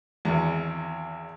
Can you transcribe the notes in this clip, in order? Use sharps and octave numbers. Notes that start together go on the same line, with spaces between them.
G#1 E2